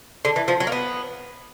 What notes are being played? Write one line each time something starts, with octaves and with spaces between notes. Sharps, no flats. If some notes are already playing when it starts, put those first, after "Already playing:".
D3
E3
F3
F#3
A#3
B3